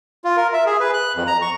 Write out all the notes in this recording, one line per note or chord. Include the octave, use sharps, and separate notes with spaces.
F4
A#4
E5
G#4
B4
F#6
F2
A#5
C#6